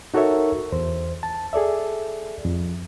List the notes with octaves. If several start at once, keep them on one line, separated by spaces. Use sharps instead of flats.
D#4 F#4 A4 A#4 C#5 E5
E2 C5
A5
G#4 A4 D5 E5
F2